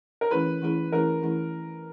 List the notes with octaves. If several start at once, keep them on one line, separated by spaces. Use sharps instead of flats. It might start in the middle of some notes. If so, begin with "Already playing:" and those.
A#4
E3 A3 C#4 E4 G#4 B4
E3 A3 C#4 E4 G#4
E3 A3 C#4 E4 G#4 A#4
E3 A3 C#4 E4 G#4